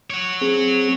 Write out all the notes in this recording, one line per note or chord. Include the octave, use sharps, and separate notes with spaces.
C#5 F#5
C4 G#4